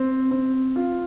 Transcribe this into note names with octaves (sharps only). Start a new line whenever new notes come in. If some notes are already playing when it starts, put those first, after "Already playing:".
Already playing: C4
C4
F4